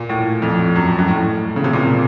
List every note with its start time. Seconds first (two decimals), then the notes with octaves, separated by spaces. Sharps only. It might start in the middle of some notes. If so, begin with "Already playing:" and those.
Already playing: A#2
0.09 A2
0.42 F2
0.76 F#2
0.99 F#2
1.08 A2
1.56 C#3
1.64 C3
1.73 A#2